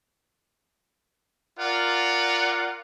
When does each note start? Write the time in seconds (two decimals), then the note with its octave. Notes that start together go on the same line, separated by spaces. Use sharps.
1.59 F4 A#4 D5 F#5